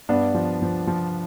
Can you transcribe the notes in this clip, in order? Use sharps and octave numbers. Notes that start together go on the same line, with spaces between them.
G2 B3 D4
F3
F3
F3